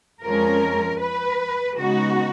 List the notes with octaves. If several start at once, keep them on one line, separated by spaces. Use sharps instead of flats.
F2 F3 G#3 C#4 A#4
B4
C#3 G#3 B3 D#4 F#4